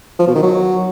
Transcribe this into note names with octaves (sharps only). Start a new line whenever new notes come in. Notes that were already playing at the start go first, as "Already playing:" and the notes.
F3
B2
D#3
F#3